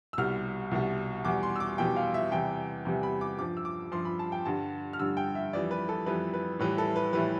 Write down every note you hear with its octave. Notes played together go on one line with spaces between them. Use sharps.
E6
C2 B2 G3 F6
C2 B2 G3
E2 B2 G3 D6
C6
E6
D6
E2 B2 G3 G5
F5
E5
E2 C3 E3 G3 G5
E2 C3 E3 G3
B5
D6
G2 F3 D6
E6
D6
G2 F3 C6
B5
A5
G5
G2 D3 G3 A5
F6
G2 D3 G3 E6
G5
E5
F2 E3 G3 D5
B4
A4
F2 E3 G3 B4
B4
A2 E3 G3 B4
A4
B4
A2 E3 G3 B4